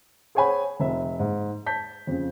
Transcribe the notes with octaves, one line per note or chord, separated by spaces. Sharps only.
G#4 C5 C#5 F#5 G#5 B5
F1 E5
G#2
A5 G6 B6
F2 C#3